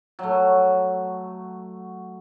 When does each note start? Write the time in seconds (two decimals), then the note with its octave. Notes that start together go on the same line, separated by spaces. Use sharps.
0.19 F#3 A3